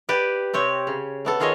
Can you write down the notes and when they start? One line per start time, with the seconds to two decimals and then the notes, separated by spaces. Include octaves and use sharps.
0.09 G4 B4 D5
0.53 C3 C4 C#5
0.87 C#3
1.25 A3 B3 A4
1.40 D#3 F4 G#4 C#5 D#5